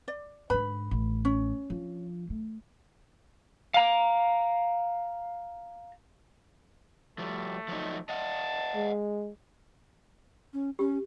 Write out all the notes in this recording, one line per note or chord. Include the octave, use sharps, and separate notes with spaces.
D5
G#2 D3 B4 B5
A1
C#4
D3 F3
A3
F5 A#5
F3 G3 A3
F3 F#3 D#4
D#5 F5 F#5 A5
G#3
C#4
C#4 G4